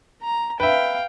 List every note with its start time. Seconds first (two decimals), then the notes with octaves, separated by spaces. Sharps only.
0.22 A#5
0.60 B4 E5 F5 G5